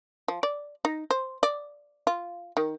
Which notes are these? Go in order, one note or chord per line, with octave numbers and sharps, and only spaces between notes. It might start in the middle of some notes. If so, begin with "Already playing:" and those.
F3
D5
D#4
C5
D5
F4
D#3